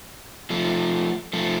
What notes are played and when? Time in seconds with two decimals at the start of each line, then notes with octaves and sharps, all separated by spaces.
0.50 F3 A3
1.33 F3 A3